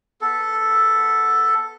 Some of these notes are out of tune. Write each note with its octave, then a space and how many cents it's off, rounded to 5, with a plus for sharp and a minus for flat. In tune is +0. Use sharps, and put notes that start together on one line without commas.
B3 +0 A4 +0